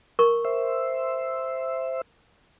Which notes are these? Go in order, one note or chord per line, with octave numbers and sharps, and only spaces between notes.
A#4 C#6
C5 E5